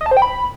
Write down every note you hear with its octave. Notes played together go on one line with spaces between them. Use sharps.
D#5
A5
C5
G5
B5